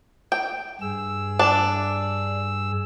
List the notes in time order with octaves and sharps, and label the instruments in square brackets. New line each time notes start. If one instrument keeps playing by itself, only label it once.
[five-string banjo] G5
[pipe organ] G2 G#4 E6
[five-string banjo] D4